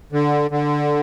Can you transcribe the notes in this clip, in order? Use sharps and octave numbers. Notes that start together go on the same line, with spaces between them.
D3
D3